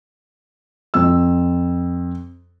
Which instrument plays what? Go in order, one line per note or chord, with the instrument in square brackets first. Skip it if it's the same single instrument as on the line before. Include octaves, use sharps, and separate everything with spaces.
[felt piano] F2 E6